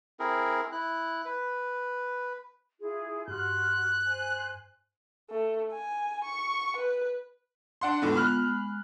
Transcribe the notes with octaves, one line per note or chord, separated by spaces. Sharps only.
C4 E4 G#4 A#4
E4 F#6
B4
E4 F4 G#4
G2 F#4 C6 F6 F#6
C5 G#5
A3
G#5
C#6
B4
D4 F#5 C6
E2 A2 D3 G#3 B3 F4
B5 F6 F#6
G#3